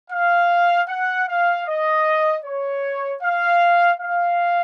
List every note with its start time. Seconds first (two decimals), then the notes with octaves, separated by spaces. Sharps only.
0.11 F5
0.88 F#5
1.28 F5
1.67 D#5
2.44 C#5
3.22 F5
4.00 F5